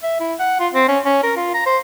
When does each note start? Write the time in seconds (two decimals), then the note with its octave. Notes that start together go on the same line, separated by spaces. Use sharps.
0.03 E5
0.20 E4
0.40 F#5
0.60 F4
0.73 C4
0.88 C#4
1.05 C#4
1.23 A#4
1.36 F4
1.54 A#5
1.66 C5